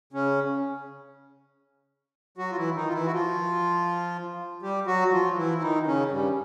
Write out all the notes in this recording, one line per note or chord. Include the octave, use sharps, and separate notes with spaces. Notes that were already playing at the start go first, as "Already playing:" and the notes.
C#3 C#4
F#3 F#4
F4
E3 E4
D#3 D#4
F4
E3 E4
F#4
F3 F4
G3 G4
F#3 F#4
F3 F4
E3 E4
E4
D#3 D#4
C#3 C#4
G2 G3